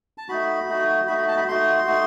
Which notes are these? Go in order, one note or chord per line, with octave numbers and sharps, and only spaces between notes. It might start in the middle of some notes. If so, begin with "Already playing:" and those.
A5
A3 D#4 F#4 B5
A3 D#4 F#4
A3 D#4 F#4 B5
B5
A5
B5
A3 D#4 F#4 C6
A3 D#4 F#4